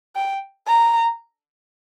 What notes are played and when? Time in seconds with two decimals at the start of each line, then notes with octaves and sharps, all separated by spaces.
0.16 G5
0.67 A#5